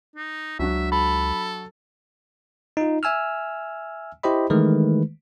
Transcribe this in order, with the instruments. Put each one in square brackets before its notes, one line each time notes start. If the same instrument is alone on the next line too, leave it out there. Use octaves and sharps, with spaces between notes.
[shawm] D#4
[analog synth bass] C#2 [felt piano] F#3 D4 F#4 [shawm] E5
[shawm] A4 [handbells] B5
[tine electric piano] D#4 F4
E5 G#5 E6 F6
E4 G4 C5 D#5 B5
D#3 E3 G#3 A3 B4